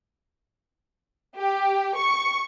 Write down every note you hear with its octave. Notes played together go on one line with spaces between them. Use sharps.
G4
C#6